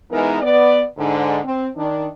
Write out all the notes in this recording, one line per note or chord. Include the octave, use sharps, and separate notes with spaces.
E3 G#3 B3 D#4 A#4
B3 D5
G#2 D3
C4
D#3 D4